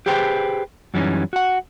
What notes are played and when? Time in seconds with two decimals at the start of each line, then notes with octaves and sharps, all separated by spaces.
0.06 G4 G#4 B4 C5 G5
0.94 F#2 E3 G3 C#4 D#4
1.33 F#4 F#5